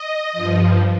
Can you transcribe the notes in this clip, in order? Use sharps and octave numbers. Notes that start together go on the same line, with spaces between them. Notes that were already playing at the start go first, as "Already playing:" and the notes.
Already playing: D#5
G2 F3